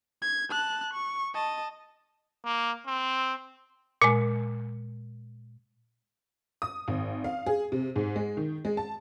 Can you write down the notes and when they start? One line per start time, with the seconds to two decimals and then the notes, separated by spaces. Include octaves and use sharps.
0.22 G#6
0.50 A5 F#6
0.93 C#6
1.34 D#5 A5
2.45 A#3
2.87 C4
4.02 A#2 G#3
6.62 D#6
6.88 G#1
7.24 F5
7.46 G#4
7.72 C3
7.96 G#2
8.16 G#3
8.37 D#3
8.65 G#3
8.77 A5